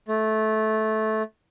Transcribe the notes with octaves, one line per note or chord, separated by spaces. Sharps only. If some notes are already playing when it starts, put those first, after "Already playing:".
A3